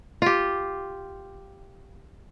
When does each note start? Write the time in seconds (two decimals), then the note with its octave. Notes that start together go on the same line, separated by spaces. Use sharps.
0.22 F4 G4